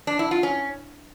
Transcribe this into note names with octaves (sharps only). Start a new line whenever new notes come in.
D4
E4
F4
C#4